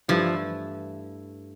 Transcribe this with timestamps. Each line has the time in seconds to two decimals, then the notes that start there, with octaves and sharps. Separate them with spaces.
0.08 G2 E3 F3 A3 E4